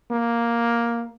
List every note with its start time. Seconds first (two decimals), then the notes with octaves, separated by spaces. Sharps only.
0.11 A#3